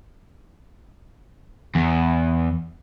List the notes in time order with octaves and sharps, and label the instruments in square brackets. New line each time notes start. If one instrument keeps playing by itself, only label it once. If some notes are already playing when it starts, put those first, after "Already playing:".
[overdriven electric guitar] E2